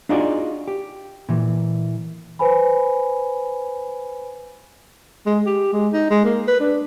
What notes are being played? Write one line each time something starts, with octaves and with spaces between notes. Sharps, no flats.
D4 D#4 F4 F#4 G#4 D5
G4
A#2 E3
B4 C5 G#5 B5
G#3
G4
G#3
D#4
G#3
A#3
B4
D4